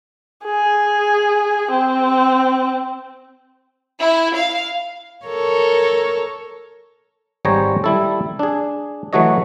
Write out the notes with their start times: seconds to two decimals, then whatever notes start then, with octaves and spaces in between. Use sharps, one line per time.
0.45 G#4
1.71 C4
4.00 E4
4.35 F5
5.26 A4 A#4 C#5
7.45 G#1 G3 G#4 C5 C#5 A#5
7.84 G3 E4 A4
8.39 D4 G#4
9.13 E3 F#3 A3 F#4 C#5 D#5